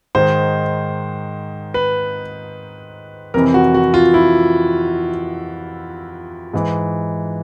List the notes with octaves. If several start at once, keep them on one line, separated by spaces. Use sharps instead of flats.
G#2 D#3 C5
B4
F2 C3 E3 A#4
F#4
F#4
F4
E4
G#2 E3